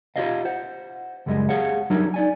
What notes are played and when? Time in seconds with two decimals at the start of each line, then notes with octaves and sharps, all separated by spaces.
0.16 F4 G4 A#4 C#5 D#5 F5
0.45 C5 F#5
1.26 C#2 F#2 G3 G#3 D#5
1.49 G4 G#4 C#5 F5 F#5
1.90 F#3 G3 D4 D#4 A#4 C#5
2.14 D#4 D5 G#5